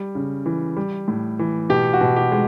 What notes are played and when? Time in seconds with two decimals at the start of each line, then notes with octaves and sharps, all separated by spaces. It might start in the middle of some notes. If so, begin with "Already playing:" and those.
Already playing: G3
0.15 C#3
0.46 E3
0.77 G3
1.08 A2
1.39 E3
1.69 B2 G4
1.93 F#4
2.01 B2
2.16 G4
2.32 G#3